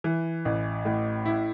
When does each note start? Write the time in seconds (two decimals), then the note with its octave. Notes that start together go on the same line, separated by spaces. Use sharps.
0.04 E3
0.45 A1
0.85 A2
1.26 E4